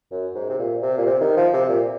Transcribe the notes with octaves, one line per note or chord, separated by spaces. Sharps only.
F#2
G#2
C3
A#2
C3
A#2
C3
D#3
F3
C3
A#2